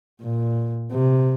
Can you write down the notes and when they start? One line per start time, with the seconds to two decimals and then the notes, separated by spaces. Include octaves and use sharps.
0.21 A#2
0.92 C3